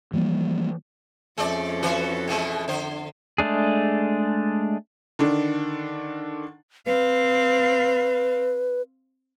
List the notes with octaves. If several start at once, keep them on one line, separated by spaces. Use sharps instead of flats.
E3 F3 G3 A#3
F2 G#3 C#4 A4 D5
E3 F#4 B4
B2 E3 G#3
D3 C5
G#3 A3 D4 G#4
D3 D#3 D4
C4 B4 F5